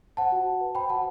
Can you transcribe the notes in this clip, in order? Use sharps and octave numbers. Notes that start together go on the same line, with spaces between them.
C5 F#5 A5
F#4
F#4
B4
C5 G5 B5
F#4 F#5 A5